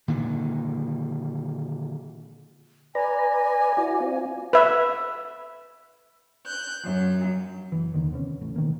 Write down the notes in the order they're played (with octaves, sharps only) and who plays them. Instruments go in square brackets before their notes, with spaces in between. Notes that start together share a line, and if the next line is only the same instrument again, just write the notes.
[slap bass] A#2 D3 D#3
[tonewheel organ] B4 D5 A#5 [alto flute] G#5
[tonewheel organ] E4 F#4 D5
C4 F4
[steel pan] B4 E5
[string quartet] F#6 G6
F#2
[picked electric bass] F#1 E3
D#2 D3 D#3
C3 B3 C#4
A1 A3
B2 D#3 E3 A#3